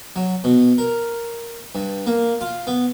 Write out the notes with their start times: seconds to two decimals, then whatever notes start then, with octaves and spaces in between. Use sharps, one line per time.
0.16 F#3
0.44 B2
0.78 A#4
1.75 G2
2.07 A#3
2.41 F4
2.67 B3